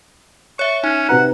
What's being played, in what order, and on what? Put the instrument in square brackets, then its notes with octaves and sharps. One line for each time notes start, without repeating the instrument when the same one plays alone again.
[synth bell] C#5 E5 [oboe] C#6
[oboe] C#4 [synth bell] D#4
[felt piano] C3 B4 A#5 [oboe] F#5